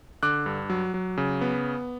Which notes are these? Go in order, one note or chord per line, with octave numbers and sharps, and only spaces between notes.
D3 D6 F#6
G2
F#3
F#3
C#3
B3